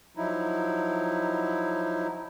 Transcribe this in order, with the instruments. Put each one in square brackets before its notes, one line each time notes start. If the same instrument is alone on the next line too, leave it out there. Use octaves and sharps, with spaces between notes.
[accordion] F3 F#3 D#4 E4